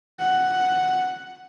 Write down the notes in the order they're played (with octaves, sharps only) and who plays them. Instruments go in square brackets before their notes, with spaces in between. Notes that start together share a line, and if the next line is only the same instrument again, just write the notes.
[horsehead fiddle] F#5